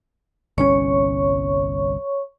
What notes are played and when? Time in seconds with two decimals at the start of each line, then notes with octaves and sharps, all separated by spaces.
0.58 G1 C2 C#4 C#5 C#6